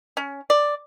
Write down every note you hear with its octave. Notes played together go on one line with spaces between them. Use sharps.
C#4
D5